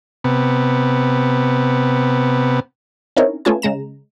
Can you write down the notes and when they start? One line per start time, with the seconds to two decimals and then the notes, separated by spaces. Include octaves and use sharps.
0.24 C3 B3
3.16 C4 C#4 D#4 E4 A#4 C#5
3.45 A3 B3 C#4 F4 G#5 A5
3.62 C#3 G#3 A#5 E7